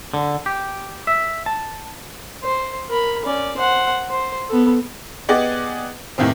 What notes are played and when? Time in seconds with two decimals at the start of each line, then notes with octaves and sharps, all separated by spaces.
0.14 D3
0.46 G4
1.07 E5
1.46 A5
2.43 C5
2.88 A#4 B5
3.25 C#4 D5
3.57 C5 F#5
4.10 C5
4.49 B3 A4
5.28 B3 G4 G#4 D5 D#5 F#5
6.18 E2 A2 C3 D#3 C4